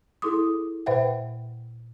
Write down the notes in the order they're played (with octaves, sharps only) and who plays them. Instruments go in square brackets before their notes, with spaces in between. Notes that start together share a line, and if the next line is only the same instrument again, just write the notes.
[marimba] E4 G#4 A4 C6 D6 D#6
A#2 B4 C5 E5 F#5 G5